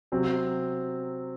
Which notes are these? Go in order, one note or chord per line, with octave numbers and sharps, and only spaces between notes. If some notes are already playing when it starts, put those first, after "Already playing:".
C3 F#3 C4